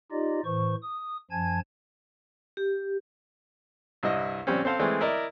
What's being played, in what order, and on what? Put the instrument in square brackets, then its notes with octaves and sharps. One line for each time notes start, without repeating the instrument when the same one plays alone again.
[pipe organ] D#4 F4 G4 D5 D#5
A2 E3 C5 C#6
D#6
F#2 F3 G#5 A5 G#6
[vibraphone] G4
[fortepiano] C2 G2 E4 D#5
A#1 G3 C4 C#4
C4 A4 C5 F5
E3 G#3 A3 C4
E4 A#4 D5 D#5